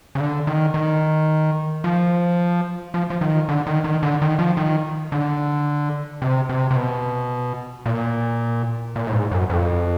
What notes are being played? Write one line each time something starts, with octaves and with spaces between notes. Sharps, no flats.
C#3
D3
D#3
D#3
F3
F3
F3
D#3
D3
D#3
D#3
D3
D#3
F3
D#3
D3
C3
C3
C3
B2
A#2
A#2
A2
G#2
F#2
F2